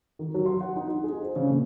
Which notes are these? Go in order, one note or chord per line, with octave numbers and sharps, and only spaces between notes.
D#3
F#3
C6
F#5
D#4
D#4
G#4
C5
C#3
A#2